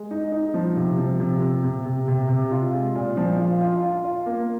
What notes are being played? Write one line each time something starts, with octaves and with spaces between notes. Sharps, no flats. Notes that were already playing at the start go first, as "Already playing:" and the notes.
Already playing: G#3
D#4
D#4
F3
C3
F3
C3
C3
C3
C3
C3
C3
F4
G#3
A#2
F3
F4
F4
F4
F4
A#3